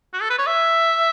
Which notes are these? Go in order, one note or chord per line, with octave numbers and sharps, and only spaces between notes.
F#4
A4
B4
C#5
E5